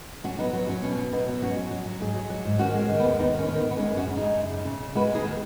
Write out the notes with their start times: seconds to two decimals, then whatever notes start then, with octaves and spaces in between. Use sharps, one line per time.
0.24 F#3 C#4 F#4
0.39 F#3 B3 D#4
0.53 F#3 B3
0.68 F#3 C#4
0.83 B2 C#4
0.98 F#3
1.13 B2 B3 D#4
1.28 F#3
1.42 G#2 C#4 F#4
1.57 F#3
1.71 F#3
1.86 F#3
2.01 G#2 D#4 G#4
2.15 F#3
2.30 F#3
2.45 G#2
2.59 D#3 C#4 F#4
2.74 G#3 C#4
2.89 D#3
3.00 B3
3.04 D#2
3.19 D#2 B3 D#4
3.34 D#3 C#4
3.49 D#3
3.58 B3
3.63 D#3
3.71 B3
3.77 G#3 C#4
3.92 F#2
3.97 C#4 F#4
4.07 C#3
4.17 G#3 D#4 G#4
4.37 F#2
4.51 C#3
4.65 C#3
4.81 C#3
4.95 G#3 F#4 B4
5.11 D#2 D#4 G#4
5.24 D#3